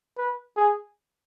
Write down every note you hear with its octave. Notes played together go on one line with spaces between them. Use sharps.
B4
G#4